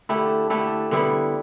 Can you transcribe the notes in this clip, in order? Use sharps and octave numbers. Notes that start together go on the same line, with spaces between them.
D3 A3 E4 G4
D3 A3 E4 G4
D3 G3 B3 E4